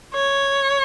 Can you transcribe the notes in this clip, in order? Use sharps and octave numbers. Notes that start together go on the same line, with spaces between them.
C#5